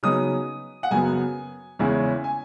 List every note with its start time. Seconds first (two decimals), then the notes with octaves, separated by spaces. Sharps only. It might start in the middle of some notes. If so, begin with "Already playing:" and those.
0.03 C#3 F#3 B3 D#4 D#6
0.83 F#5
0.91 F#2 C#3 F#3 B3 G#5
1.79 E2 C#3 G#3 C#4 E4
2.24 G#5